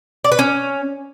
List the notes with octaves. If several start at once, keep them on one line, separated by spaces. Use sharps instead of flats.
D5
B4
C#4